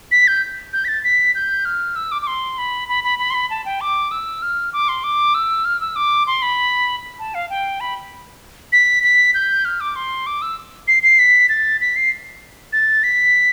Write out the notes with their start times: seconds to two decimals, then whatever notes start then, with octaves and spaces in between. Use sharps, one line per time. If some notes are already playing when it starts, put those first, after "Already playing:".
0.12 B6
0.28 G6
0.73 G6
0.85 B6
0.88 A6
1.04 B6
1.35 G6
1.65 F6
1.96 E6
2.12 D6
2.22 D6
2.27 C6
2.58 B5
2.89 B5
3.04 B5
3.19 B5
3.30 C6
3.35 B5
3.50 A5
3.65 G5
3.81 D6
4.11 E6
4.42 F6
4.73 D6
4.89 C6
5.04 D6
5.35 E6
5.65 F6
5.81 E6
5.96 D6
6.27 C6
6.42 B5
7.19 A5
7.34 F5
7.50 G5
7.80 B5
8.72 B6
9.03 B6
9.34 G6
9.65 F6
9.81 D6
9.96 C6
10.27 D6
10.42 E6
10.88 C7
11.03 C7
11.19 B6
11.49 A6
11.81 B6
11.96 C7
12.73 A6
13.03 B6